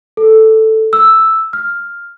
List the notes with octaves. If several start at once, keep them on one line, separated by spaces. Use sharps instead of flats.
A4
E6
F6